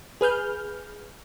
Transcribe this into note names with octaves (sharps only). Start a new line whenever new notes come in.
G#4 B4 F6 G6